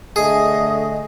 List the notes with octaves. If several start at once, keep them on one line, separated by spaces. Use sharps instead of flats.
D3 A3 G#4 D#5